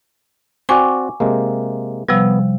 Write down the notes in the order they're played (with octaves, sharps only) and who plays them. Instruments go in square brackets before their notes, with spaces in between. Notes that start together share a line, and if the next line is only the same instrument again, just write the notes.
[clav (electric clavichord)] C4 F#4 D5 [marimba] G#5 C#6 D6
[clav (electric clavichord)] C3 G#3 A#3
[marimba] C3 F3 G3 [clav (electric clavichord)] B3